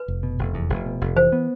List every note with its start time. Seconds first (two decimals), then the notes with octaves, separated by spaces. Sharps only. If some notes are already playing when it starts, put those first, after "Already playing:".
Already playing: B4
0.08 F1
0.23 B2
0.38 F1
0.54 E2
0.69 F1
0.85 B2
1.01 F1
1.16 E3 C5
1.32 B3